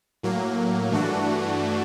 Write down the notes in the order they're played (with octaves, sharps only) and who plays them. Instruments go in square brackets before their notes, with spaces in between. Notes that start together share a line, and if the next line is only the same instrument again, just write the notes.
[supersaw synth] A2 F#3 A#3
G2 E3 A3 D4 F#4